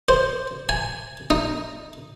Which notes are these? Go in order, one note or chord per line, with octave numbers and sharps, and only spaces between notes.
C5
G#5
D#4